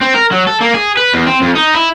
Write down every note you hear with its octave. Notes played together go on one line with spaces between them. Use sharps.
C4
A#4
F#3
A4
A#3
G#4
B4
E2
C4
F2
D#4
E4